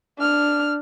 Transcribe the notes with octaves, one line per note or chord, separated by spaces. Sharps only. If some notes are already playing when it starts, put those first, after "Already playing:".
D4 F6